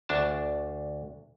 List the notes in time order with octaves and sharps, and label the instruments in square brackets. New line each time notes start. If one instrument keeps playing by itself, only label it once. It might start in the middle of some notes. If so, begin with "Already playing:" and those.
[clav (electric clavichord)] D2 D4 A5